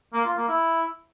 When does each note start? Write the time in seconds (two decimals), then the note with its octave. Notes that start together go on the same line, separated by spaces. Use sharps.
0.13 A#3
0.25 F4
0.37 A#3
0.48 E4